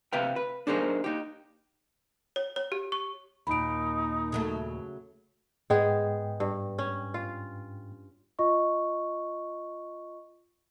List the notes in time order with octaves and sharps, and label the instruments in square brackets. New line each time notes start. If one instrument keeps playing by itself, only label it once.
[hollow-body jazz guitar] C3 B4 E5 F5 G5
B4
D4 D#4 G#4 A#4 C5
D#4 G4
[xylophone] C#5
C#5
G4
C#6
[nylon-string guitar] D#2 A#2 [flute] D#4 [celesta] B5 D7
[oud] C#3 F#3 A3
[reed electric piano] G#2 G5 [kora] G#3 B3 G#4
[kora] G2
C#4
F4
[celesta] F4 D#5 C#6